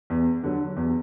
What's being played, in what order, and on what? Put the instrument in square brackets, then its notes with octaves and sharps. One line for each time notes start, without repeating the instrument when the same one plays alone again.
[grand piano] E2
D3 F#3
E2